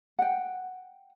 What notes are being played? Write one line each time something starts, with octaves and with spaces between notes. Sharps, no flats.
F#5 G5